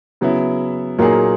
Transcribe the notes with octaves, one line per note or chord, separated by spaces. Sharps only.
C#3 F#3 B3 E4
A#2 F#3 A#3 D#4 G#4